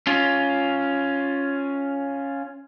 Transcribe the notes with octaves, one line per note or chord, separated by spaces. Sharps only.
C#4 F4